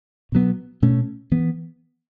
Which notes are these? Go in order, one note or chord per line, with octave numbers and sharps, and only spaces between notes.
B2 F#3 B3
B2 A3 C#4
E3 B3